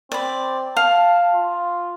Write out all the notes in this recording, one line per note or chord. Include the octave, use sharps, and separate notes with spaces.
C4 D5 B5
F5 A5
F4